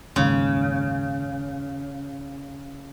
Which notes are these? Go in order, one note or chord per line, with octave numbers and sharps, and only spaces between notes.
F#1 D#2 G#2 C#3